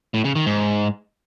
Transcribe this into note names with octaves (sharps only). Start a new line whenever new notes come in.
A2
C#3
D#3
G#2